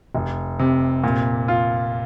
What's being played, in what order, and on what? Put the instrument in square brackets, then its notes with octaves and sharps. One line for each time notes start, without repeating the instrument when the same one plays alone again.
[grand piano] F1
C3
A#2
F4